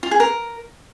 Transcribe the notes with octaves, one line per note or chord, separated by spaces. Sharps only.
F4
G#4
A#4